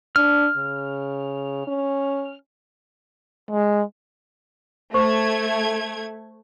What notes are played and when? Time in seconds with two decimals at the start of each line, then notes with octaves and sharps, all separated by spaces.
0.16 D4 F6
0.57 C#3
1.67 C#4
3.51 G#3
4.94 A3 C5 C#6 G#6